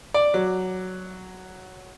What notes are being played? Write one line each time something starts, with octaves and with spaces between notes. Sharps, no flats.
D5
F#3